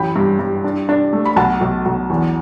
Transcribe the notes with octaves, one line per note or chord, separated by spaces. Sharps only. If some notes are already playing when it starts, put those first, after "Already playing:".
Already playing: A1 F#2 G5 B5
G2
G2
D4
D4
A3
B5
B1 F#5 A5
B1
B1
E2